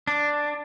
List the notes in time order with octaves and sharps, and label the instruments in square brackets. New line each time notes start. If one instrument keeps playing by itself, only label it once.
[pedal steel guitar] D4